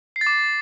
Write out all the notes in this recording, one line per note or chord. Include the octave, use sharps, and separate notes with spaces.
C7
A6
D6